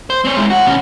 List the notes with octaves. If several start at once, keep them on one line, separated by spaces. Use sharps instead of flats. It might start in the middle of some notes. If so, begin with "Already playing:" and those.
C5
C4 C#5
G#3 E4
F#4
B2 C#4